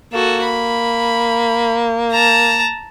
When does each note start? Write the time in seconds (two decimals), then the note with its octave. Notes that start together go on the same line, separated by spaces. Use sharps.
0.13 A#3 F#4 A4
0.44 B5
2.12 A5 A#5